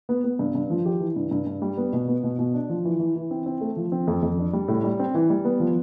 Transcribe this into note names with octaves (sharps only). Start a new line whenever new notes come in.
B3
B3
G2
G2
F3
G4
E3
G2
G2
G2
G3
B3
B2
B3
B2
B2
D4
F3
E3
E3
E3
C4
C4
A3
F3
C4
F2
F2
D4
G3
A2
G3
C4
E3
G3
B3
F3